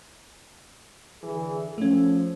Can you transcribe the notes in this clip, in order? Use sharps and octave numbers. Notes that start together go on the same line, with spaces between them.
D3 E3 G#4
F3 A3 C#4